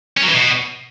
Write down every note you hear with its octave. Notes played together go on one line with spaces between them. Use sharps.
C#4
F#3
E3
B2